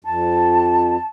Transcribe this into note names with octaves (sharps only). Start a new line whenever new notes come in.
F2 A5